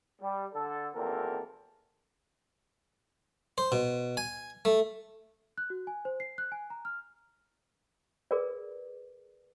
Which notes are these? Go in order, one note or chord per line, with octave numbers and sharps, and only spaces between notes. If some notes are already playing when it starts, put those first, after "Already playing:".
G3
D3 A4
G#1 E2 A#3 C4 A4 A#4
C5
B2
G#5
A3
F#6
F#4
G#5
C5
C7
F#6
G#5
A#5
F6
G#4 A#4 B4 D5